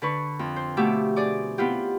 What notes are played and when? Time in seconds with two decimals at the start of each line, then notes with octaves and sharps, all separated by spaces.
0.02 D3 B4 C#6
0.39 F2
0.56 C5
0.77 B2 F3 A3 G4 E5 D6
1.16 G#4 D5 D6
1.58 B3 C4 E4 F4 G4